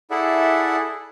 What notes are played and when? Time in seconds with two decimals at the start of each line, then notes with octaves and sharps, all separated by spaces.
0.11 E4 G#4 A4 D5 E5 F#5